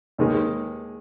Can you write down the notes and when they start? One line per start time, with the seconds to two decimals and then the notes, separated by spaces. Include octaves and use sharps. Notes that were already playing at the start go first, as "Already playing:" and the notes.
0.18 D#2 D#3 G#3